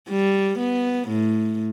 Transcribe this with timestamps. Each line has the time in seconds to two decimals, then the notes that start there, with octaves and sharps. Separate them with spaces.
0.09 G3
0.59 B3
1.08 A2